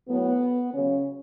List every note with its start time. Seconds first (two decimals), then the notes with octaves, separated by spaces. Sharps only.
0.08 A2 F#3 B3
0.73 C#3 F#3 C#4